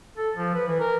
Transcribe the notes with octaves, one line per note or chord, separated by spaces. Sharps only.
A4
F3
B4
E3
A#4